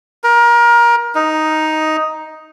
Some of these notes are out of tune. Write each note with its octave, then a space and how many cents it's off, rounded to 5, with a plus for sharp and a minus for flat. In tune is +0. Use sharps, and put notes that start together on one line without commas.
A#4 +25
D#4 +5